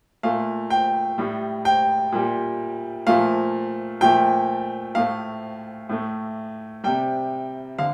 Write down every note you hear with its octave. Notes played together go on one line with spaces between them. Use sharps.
A#2 A3 F5
G5
A2 G3
G5
A#2 G3
A#2 F3 A3 F5
A#2 F3 A3 G5
A2 A3 F5
A2 A3
C3 G3 G5
D3 F5